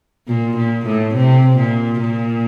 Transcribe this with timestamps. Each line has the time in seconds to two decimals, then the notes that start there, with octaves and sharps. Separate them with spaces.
0.28 A#2
0.57 A#2
0.86 A2
1.14 C3
1.57 A#2
2.00 A#2